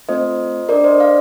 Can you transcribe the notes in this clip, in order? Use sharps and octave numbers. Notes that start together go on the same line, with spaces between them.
A3 C4 F4 A4 C5 D#5
D4 A4 A#4 D5
C5 D#5
D5 F5